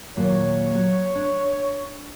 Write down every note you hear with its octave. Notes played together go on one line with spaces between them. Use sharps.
D#2 A#2 F#3 C#5
F#3
D4